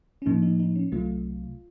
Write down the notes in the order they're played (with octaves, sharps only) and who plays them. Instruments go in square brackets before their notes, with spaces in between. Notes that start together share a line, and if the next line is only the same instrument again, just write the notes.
[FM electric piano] C#4
A2 F3 A#3 D#4
D#4
D#4
C#4
C2 C3 F#3 A3 F4